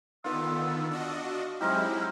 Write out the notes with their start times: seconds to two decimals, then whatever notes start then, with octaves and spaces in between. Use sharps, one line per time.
0.24 D3 D#3 B3 F4 E6
0.91 D4 F#4 D#5
1.61 F#3 G#3 C4 D#4 E4 G4 F6